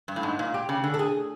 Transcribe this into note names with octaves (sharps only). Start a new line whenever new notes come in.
G2
A2
G#2
A#2
G4
C#3
D3
A4
G#4